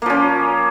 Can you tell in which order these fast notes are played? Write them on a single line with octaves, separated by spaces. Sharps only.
A#3 F3 C#4